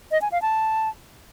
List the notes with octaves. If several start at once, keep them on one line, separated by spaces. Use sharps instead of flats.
D#5
G#5
F5
A5